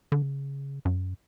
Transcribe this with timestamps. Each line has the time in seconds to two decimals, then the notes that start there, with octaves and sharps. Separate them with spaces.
0.12 D3
0.22 C#3
0.85 F#2